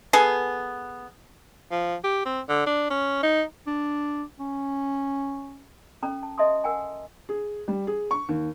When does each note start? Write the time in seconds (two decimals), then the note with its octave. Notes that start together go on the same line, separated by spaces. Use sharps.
0.13 B3 G#4 A4 G#5
1.71 F3
2.04 G4
2.26 C4
2.49 D3
2.66 D4
2.90 C#4
3.23 D#4
3.67 D4
4.39 C#4
6.02 C#4 A4 A#5
6.23 A5
6.38 A4 D#5 E5 A5 C6 D#6
6.64 A#4 F#5 G#5 A#5
7.29 G#4
7.68 G3
7.87 G#4
8.11 C#6
8.29 D#2